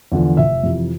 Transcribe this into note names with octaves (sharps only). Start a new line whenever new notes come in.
E2 D3 F3
F1 E5
F2 C3 E3